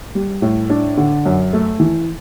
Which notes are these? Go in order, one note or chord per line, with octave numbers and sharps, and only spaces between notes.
G3
A2
D4
D3
F#2
A3
E3